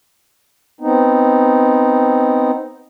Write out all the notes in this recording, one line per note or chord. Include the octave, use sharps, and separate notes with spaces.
B3 C4 D#4